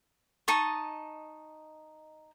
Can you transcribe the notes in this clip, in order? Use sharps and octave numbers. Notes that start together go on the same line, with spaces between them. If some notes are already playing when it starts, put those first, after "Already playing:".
D#4 D#5 A5 C#6